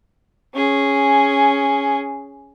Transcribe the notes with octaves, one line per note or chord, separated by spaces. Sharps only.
C#4 G#4